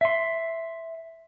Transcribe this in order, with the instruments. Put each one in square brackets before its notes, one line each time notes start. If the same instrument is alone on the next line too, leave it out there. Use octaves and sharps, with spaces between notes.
[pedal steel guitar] E5 C6